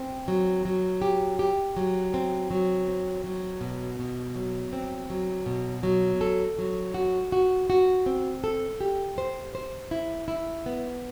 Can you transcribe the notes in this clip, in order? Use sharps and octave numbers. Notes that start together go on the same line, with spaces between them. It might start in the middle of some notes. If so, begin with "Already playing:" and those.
Already playing: C4
F#3
F#3
G4
G4
F#3
C4
F#3
C4
F#3
B2
B2
F#3
C4
F#3
B2
F#3
A4
F#3
F#4
F#4
F#4
C4
A4
G4
C5
C5
E4
E4
B3